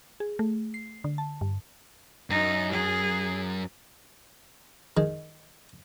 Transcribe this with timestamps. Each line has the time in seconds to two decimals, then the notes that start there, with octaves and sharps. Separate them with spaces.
0.20 G#4
0.39 A3
0.74 C7
1.04 D3
1.18 A5
1.41 G2
2.30 F#2 D#4
2.72 G#4
4.97 D#3 G#3